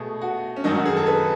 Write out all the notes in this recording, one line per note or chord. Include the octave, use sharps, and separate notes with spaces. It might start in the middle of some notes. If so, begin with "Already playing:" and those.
Already playing: B2 A3 G#4
F#4
C#4
F#2 D#3 F#3 D#4
F#4
G#4
A4
B4